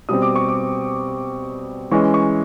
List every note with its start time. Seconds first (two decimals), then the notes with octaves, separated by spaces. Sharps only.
0.09 B2 G3 C4 D#6
0.22 D6
0.36 C#6
0.49 D6
1.91 E3 G#3 C#4 C#6
2.14 C#6